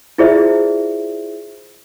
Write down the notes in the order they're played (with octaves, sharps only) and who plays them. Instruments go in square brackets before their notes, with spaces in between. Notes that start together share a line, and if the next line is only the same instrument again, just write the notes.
[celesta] E4 F4 G#4 C5 D5 E5